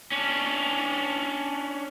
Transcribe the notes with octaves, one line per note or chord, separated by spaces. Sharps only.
C#4 D4